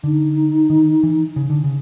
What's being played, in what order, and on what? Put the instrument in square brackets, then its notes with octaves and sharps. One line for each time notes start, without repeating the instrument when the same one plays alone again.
[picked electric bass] D3 [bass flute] D#4
[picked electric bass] D#3
E3
C#3
D3
C#3